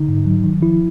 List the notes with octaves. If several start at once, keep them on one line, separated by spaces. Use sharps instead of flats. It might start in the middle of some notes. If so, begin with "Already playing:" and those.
Already playing: D3 D#4
G#2
F#3
D#3
F3 E4